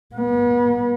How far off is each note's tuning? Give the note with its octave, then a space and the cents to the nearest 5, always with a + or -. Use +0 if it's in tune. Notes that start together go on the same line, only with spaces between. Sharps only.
B3 -40